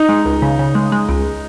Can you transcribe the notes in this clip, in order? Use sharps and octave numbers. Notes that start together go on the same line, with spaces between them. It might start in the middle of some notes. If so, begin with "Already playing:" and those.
Already playing: D#4
G#3
C#2
C#3
C#3
G#3
G#3
C#2